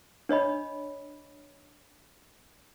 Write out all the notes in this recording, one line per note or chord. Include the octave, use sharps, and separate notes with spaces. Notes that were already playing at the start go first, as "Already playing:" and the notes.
D4 C#5 D#5 B5